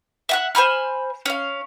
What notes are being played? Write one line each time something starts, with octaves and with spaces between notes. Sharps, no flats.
E5 F#5 F#6
C5 G#5 B5 F6
C#4 F5